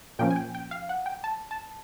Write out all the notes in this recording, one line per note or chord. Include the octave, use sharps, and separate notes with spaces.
A#2 F3 A#3 C#4 G5
G#5
G5
G5
F5
F#5
G5
A5
A5